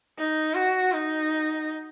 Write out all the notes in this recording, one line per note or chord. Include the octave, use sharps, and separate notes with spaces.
D#4
F#4
D#4